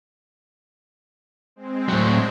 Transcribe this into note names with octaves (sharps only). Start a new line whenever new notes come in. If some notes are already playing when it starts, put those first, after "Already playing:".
G#3 C4
A2 F#3